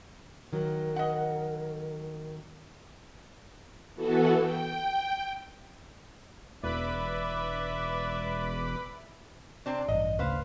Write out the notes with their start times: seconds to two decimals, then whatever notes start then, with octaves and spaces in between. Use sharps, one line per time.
0.53 D#3 F#3 A#4
0.96 D#5 F#5
3.95 E3 B3 F#4 A4
4.40 G5
6.64 E1 B4 D5 E5 B5 D6
9.66 C3 C4 D4
9.88 A1 G2 D#5
10.19 D1 C#3 A3 B4 C5 F5